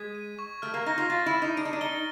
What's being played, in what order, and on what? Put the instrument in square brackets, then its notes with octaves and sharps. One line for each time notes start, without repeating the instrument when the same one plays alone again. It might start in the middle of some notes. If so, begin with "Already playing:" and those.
Already playing: [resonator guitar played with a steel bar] G#3 [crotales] G#6 B6
[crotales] D#7
C#6
[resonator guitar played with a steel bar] A3 [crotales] F6
[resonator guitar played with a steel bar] A#3
[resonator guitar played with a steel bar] D#4 [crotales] A#6
[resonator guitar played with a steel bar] F4
[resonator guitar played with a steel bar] F4 [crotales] A6
[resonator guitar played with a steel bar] E4
[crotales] A6
[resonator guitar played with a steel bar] D#4
[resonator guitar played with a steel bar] D4 [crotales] D7
[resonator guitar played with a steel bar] D#4
D4
[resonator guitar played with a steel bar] D#4 [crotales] G7